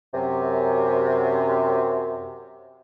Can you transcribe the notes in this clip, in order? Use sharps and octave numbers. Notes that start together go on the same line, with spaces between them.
F#2 C3